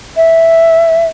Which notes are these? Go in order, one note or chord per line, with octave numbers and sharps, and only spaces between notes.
E5